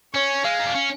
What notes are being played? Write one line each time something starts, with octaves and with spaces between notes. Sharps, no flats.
C#4 C#5
G#3 F5
D#4
D4
C#4